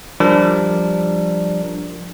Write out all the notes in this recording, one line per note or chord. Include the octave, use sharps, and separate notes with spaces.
F3 G3 D4 A#4